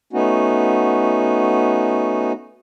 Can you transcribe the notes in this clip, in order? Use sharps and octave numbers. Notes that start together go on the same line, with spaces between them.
A3 B3 C#4 D#4 F#4